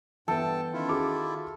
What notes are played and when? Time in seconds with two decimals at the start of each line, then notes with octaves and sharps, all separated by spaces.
0.28 G2 E3 B3 A4 E5 G5 A5
0.73 D#3 C#4 E4 F4
0.88 F#4 G#4 D6